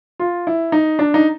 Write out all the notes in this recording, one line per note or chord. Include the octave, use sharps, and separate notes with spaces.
F4
E4
D#4
D4
D#4